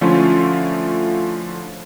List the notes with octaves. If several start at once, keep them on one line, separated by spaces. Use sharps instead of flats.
D3 F3 A3 C#4 E4 F4